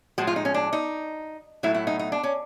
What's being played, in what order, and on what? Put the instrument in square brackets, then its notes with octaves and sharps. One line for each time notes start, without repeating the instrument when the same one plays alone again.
[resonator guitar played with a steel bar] A2 F3 G#3 F#4
F4
D#4
C#4
D4
D#4
A2 F#3 A3 E4
E4
D#4
D#4
D4
C#4